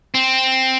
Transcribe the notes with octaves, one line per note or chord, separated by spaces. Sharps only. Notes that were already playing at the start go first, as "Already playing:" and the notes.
C4